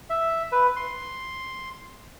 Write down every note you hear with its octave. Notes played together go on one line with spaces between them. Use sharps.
E5
B4
C6